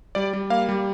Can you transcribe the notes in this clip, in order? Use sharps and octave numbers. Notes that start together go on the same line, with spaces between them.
G3 D5
G3
A#3 F5
G3